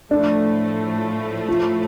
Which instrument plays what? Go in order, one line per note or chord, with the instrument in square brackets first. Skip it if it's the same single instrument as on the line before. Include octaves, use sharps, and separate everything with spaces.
[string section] A2 F3 A3 [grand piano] D4
[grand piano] F4